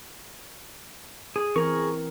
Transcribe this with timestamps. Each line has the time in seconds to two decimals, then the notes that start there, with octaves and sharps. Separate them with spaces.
1.36 G#4
1.56 E3 C4 G#4 A#4 A#5 C#6